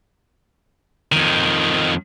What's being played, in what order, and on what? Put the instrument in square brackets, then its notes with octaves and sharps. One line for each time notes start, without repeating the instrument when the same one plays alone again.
[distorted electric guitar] F2 D#3